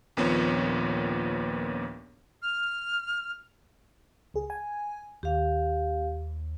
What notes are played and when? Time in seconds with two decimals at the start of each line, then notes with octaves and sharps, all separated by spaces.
0.17 A#1 D#2 A#2 B3 C4 C#5
2.42 F6
4.34 C#2 G#4
4.50 G#5
5.23 D#2 G4 F5